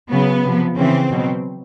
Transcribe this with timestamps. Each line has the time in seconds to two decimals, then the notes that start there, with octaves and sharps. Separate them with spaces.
0.11 C#3 F#3 B3
0.45 C3 F3
0.77 C#3 E3 C4
1.10 B2 F#3